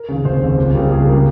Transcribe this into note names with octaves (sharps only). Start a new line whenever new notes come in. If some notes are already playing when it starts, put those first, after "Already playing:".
Already playing: A#4
D#2 C#3
F1 C5
D#2 C#3
C#2
C#3 G3 A#3
C#2 G#4
C#3 G3 A#3